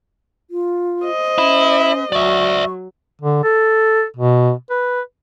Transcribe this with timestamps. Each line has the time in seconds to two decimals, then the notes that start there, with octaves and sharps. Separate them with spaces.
0.51 F4
1.03 C5 D#5
1.38 C#4 E4
2.12 F#3 D5 E5 C#6
3.21 D3
3.43 A4
4.17 B2
4.70 B4